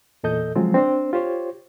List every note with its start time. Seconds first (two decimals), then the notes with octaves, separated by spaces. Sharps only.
0.23 E2 A#2 A4 D#5 G6
0.55 C#3 F3 F#3 G#3 C4 F4
0.74 C4 D4 C5
1.13 F4 G4 C5 C#5